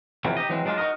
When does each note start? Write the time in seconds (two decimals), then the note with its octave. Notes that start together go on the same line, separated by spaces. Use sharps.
0.25 F2 C3 E3 F#3
0.37 D#4 G4 D#5
0.49 E3 F#3 G#3 C4
0.65 F#3 G#3 D4 D#4 F4
0.78 D#4 F#4 A4 A#4 D#5